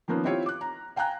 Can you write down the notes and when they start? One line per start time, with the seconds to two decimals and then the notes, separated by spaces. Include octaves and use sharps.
0.08 D#3 F3 A#3 B3 C#4 F4
0.25 C4 E4 F4 G4 C#5
0.46 D6 F#6
0.61 A#5
0.96 F5 G5 G#5 A#5 F#6